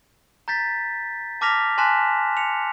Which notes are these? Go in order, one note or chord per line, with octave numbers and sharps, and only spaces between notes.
A#5 G6 A6 B6
A5 D6 F6 A#6 B6 F7
G#5 A5 C6 F#6 B6 E7
C#7 F7